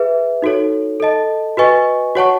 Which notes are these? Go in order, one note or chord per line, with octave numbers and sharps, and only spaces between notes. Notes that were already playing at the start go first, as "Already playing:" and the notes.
Already playing: G#4 B4 E5
D#4 F#4 A4 C#5
A4 D#5 A5
F#4 B4 D#5 G#5 C#6
F#4 C#5 F#5 A5 C#6